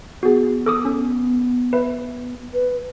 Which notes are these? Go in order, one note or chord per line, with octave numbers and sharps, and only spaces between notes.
B3 F#4 G#4
A4 D6 D#6
C#4
B4 E5
B4